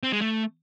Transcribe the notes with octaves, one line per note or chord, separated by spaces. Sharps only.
C4
G#3
A3